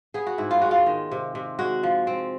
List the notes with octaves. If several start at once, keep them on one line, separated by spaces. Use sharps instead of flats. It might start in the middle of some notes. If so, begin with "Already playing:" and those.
B3 G#4
F#4
G#2 E4
F4
G#3 F#4
F4
D#3
C3
C3
G#3 F#4
F3
C4